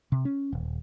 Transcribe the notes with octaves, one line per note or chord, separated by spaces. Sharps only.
C3
C#4
D#1